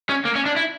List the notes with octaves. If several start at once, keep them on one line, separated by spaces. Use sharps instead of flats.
C#4
A#3
C#4
D4
E4